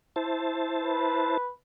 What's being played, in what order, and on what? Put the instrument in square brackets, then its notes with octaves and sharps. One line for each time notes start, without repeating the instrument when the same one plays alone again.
[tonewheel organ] E4 C5 A5
[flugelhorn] B4